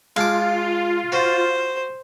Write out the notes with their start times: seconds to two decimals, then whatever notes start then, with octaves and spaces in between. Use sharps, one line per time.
0.16 G#3 F4 F5 A5 D6
1.12 F#4 C5